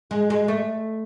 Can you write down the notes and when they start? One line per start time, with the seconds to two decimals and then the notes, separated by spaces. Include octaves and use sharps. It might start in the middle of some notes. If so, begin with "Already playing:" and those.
0.11 G#3
0.30 G#3
0.48 A3